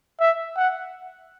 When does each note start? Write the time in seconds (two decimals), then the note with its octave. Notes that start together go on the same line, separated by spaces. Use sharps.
0.20 E5
0.56 F#5